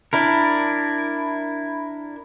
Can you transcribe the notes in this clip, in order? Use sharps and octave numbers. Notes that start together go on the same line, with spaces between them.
D4 E4 A#4